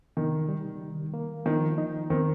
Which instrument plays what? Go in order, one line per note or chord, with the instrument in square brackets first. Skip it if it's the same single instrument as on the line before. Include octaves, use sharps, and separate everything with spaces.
[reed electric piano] C3 [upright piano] D#3
[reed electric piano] G3
D#3
A#3
[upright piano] D#3 [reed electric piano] F3
[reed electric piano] D#4
[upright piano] D#3 [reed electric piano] C4